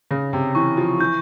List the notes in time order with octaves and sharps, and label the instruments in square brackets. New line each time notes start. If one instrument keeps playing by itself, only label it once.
[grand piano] C#3 [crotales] A#6
[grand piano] C3
[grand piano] E3 [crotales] C#6
[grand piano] F3
[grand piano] E3 [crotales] G6